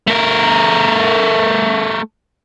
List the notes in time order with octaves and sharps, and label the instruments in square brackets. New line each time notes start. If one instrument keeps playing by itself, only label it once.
[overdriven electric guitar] A3 A#4